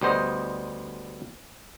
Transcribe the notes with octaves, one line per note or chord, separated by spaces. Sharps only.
D2 G3 B3 C5 D#5